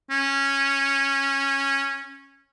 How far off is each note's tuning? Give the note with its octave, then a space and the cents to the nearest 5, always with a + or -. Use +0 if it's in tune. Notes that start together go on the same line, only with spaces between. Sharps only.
C#4 -10